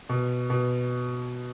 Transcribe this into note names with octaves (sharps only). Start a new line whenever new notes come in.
B2
B2